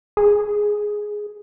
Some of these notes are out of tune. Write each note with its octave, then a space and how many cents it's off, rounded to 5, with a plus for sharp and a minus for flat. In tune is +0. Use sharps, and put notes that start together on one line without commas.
G#4 +5